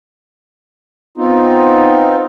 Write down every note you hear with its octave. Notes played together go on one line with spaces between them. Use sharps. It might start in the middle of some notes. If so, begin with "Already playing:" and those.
B3 C4 D#4 F4